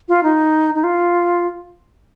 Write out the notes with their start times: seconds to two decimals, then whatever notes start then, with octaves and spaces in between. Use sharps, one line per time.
0.08 F4
0.23 D#4
0.75 D#4
0.84 F4